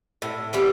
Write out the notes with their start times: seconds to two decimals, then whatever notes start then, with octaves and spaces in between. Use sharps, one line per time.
0.22 A2
0.53 E3 G3 B3